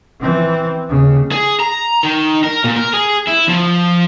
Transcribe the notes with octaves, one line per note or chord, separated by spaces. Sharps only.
E3 C4
D#2 C#3
G#4
A#5
D#3
A#4
A#2
A#4
G#4
E4
F3